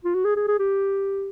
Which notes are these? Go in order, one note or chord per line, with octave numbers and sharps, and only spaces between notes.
F4
F#4
G#4
G#4
G#4
G4